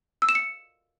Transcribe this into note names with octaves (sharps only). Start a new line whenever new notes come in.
E6
E7
C#7